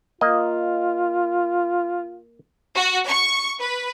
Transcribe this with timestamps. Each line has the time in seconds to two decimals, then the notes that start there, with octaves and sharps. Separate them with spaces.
0.21 A#3 F4 D#5
2.74 F#4
3.08 C#6
3.60 B4